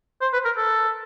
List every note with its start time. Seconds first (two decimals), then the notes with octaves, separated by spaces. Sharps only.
0.22 C5
0.33 B4
0.45 A#4
0.57 A4